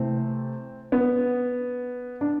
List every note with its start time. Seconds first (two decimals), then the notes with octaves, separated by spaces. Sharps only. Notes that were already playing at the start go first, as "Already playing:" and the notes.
Already playing: C3 E3 A3 C4
0.92 B3
2.21 D4